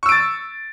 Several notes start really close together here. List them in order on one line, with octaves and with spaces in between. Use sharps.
C#6 E6 D7 A6